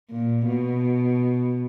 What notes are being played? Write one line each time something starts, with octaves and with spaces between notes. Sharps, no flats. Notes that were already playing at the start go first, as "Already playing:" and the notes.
A#2
B2